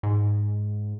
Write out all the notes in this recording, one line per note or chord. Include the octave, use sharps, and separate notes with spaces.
G#2